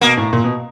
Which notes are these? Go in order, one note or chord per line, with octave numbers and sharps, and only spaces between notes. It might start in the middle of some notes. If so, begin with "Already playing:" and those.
B2 A#3
A2
A#2
B2